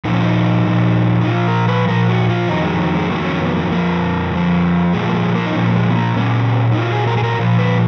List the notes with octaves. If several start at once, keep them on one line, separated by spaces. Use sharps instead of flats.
A#2 F3 D#4
C#4
D#4
A#2 F3
D#4
A#2 F3 F4
A#4
B4
A#2 F3 A#4
F#4
F4
F2 D#3 F#3 D#4
G#3
F#3
G#3
F2 D#3 F#3 A#3
C#4
B3
A#3
F2 F3 A#3
F2 F3
A#2 F3 G#3
A#3
G#3
A#3
D#4
A#2 F3 C#4
A#3
G#3
B3
A#3
A#2 F#3 C#4
D#4
A#2 F#3 F4
G#4
A#4
G#4
A#4
A#2 F3
B4